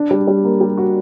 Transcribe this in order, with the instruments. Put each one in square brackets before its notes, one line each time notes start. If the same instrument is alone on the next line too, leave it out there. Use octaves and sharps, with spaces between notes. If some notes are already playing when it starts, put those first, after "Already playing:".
Already playing: [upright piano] D4
G3
G3
A#3
G3
F#4